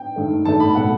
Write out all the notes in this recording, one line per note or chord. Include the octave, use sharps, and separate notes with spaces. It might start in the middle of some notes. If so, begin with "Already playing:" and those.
Already playing: G5
G2 D#3 A3
G2 D#3 A3 A5
B5
B2 A3 F#5